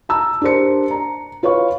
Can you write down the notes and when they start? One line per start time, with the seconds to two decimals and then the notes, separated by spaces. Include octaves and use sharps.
0.09 A5 A#5 E6
0.41 D4 G4 A#4 C5 C#7
0.91 A#5
1.43 F4 B4 C#5 F5 C#6